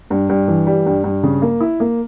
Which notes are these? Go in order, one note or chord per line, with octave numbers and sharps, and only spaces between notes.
G2
G2
E3
G3
G2
G2
C#3
A#3
E4
A#3